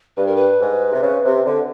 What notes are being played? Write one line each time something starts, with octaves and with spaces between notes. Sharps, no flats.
G2 B4
A#4
B4
G#2
C3
C#3
C3
D3